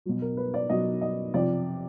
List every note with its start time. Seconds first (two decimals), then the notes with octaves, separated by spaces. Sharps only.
0.06 B2 F#3
0.22 A#4
0.37 B4
0.54 D5
0.70 B2 F#3 D#5
1.01 D#5
1.34 C3 F3 D5